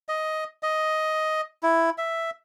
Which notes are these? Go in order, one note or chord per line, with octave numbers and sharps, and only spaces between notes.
D#5
D#5
E4
E5